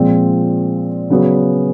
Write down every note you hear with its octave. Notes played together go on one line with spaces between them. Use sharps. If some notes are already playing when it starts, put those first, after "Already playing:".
Already playing: A#2 F3 G#3 C4
C#3 F#3 B3